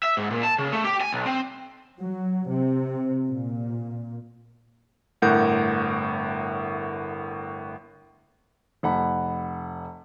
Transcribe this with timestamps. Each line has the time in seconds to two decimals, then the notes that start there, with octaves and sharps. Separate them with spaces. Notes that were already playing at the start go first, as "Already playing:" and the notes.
0.03 E5
0.17 G#2
0.31 A#2
0.43 A5
0.58 C#3
0.72 A3
0.84 G4
1.01 G#5
1.12 B1
1.26 C4
1.99 F#3
2.48 C3
3.27 A#2
5.22 G1 A2 A#4 F#5 G6
8.83 F1 F#5 B5